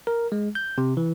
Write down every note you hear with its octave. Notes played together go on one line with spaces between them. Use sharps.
A#4
G#3
G6
C3
E3